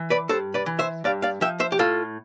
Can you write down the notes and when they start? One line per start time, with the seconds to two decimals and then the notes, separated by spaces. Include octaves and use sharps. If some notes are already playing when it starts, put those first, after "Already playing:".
Already playing: E3
0.10 B4 D5
0.29 G2 A4 C5
0.54 B4 D5
0.66 E3
0.79 C5 E5
1.04 G2 D5 F5
1.22 D5 F5
1.41 F3 E5 G5
1.60 C5 E5
1.72 G4
1.79 A2 F4 A4